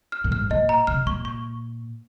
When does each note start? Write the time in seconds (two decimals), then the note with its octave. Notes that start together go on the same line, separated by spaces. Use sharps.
0.12 F6
0.24 A#2
0.31 G#2 F6
0.50 A#2 D#5
0.69 A#5
0.87 C3 F6
1.06 A#2 C#6
1.25 C#6